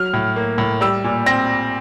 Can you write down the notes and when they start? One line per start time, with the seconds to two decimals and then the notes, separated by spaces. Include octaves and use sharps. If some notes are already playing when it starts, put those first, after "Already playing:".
Already playing: F#3 F6
0.13 A2
0.36 A#3
0.58 A2
0.81 G3 E6
1.04 A#2
1.26 C4 A#6